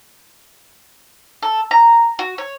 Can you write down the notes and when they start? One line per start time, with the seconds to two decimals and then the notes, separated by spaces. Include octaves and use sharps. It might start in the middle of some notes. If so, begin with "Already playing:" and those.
1.43 A4
1.71 A#5
2.19 F#4
2.38 C#5